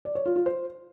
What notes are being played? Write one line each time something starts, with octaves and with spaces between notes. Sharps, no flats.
D5
C#5
F4
F4
C5